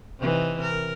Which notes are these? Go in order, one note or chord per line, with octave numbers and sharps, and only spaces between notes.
C3 E3 D#4
A#4